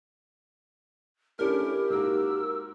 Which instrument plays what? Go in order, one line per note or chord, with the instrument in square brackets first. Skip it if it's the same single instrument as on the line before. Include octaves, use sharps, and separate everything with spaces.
[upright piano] A3 C#4 D4 [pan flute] E4 [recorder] G4 [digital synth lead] A#4
[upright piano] G#2 A#3 F#4 [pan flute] E6